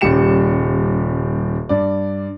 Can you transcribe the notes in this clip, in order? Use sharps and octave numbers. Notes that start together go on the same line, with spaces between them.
D#1 C#3 G3 G4 C#7 E7
G2 D5